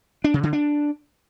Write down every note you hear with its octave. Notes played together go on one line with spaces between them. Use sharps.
D4
C#3
D3
D4